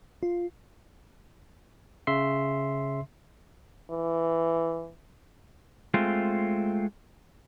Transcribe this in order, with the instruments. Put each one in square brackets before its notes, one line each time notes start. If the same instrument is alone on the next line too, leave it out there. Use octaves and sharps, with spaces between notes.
[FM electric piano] F4
[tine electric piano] C#3 E5 C6 C7
[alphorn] E3
[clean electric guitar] G#3 A3 C4 F4